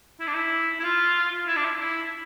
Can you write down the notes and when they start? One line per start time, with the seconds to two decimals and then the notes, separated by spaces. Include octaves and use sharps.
0.20 E4
0.27 D4
0.34 E4
0.79 E4
0.84 F4
1.47 E4
1.56 D4
1.64 E4
1.80 E4